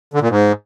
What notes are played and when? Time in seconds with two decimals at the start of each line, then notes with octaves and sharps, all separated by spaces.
0.14 D3
0.22 A#2
0.29 G#2